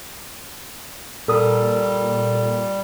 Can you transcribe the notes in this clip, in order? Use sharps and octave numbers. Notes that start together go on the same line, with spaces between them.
A#2 G3 A4 A#4 D#6